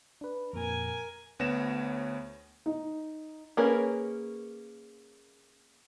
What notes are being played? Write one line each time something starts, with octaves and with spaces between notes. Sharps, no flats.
D4 B4
F2 A#2 A#4 G#5
D2 B3 C#5 A#6 E7
D#4
A#3 C#4 G#4 A#4 B4